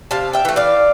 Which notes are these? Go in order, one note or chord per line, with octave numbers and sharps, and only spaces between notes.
C3 F5 A5
E5 G5
E3 A3
D5 F5